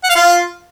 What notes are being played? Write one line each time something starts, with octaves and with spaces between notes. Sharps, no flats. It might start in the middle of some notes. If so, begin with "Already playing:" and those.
F#5
F5
F4